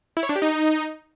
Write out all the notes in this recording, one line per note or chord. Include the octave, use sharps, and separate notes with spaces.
E4
C#5
D4
G4
D#4